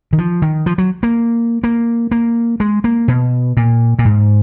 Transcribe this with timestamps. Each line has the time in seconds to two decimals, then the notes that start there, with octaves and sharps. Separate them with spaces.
0.13 D#3
0.18 F3
0.42 D#3
0.66 F3
0.78 F#3
1.03 A#3
1.64 A#3
2.11 A#3
2.60 G#3
2.84 A#3
3.08 B2
3.57 A#2
3.99 A#2
4.05 G#2